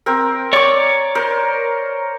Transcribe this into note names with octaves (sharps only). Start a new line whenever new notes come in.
C4 A#4
C#5 D5 C#6 D6
A#4 C5